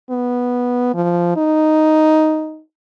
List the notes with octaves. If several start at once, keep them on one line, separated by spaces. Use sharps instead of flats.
B3
F3
D#4